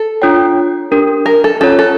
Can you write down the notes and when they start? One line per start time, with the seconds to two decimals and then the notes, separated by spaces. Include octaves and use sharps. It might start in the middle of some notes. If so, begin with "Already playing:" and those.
Already playing: A4
0.22 D4 F4 C#5 G5
0.91 D4 G4 A#4
1.26 A#4
1.44 A4
1.61 C#4 F4 A4 C#5
1.79 A4